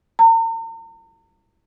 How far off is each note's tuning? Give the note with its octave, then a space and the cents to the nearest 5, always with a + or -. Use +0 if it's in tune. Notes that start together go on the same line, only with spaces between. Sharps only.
A#5 -45